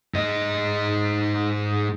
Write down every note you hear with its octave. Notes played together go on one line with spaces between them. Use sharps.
G#2 D#5